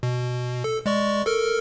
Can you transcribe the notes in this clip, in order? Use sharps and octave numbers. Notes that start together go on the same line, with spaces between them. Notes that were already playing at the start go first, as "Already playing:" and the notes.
B2
A4
G#3 D5 C#6
A4 A#4 F6